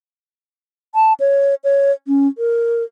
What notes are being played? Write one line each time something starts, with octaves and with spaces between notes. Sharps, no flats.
A5
C#5
C#5
C#4
A#4